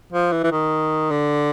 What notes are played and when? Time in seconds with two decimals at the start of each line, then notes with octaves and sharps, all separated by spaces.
0.13 F3
0.32 E3
0.44 E3
0.52 D#3
1.11 D3